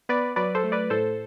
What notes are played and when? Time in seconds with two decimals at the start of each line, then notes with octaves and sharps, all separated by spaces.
0.09 B3 B4 D5
0.36 F#3 B4 D5
0.55 A4 C5
0.63 A3
0.72 B4 D5
0.90 A2 A4 C5